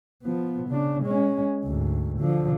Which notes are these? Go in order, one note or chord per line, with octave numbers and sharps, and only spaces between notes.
F3 B3
C#3 D4
G#3 C#4
D2 G#2
D3 F3